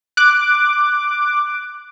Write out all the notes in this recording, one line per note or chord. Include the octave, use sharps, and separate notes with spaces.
D6 F#6